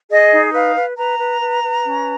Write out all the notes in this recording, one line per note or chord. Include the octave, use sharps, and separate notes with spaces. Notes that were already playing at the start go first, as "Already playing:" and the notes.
G#4 D#5
D#4
B4 F5
B4
B4 A#5
B4
B4
B4
C#4